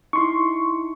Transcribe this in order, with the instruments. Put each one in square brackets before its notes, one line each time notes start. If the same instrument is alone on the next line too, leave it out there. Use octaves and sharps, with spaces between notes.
[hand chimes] D#4 E4 [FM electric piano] C6 C#6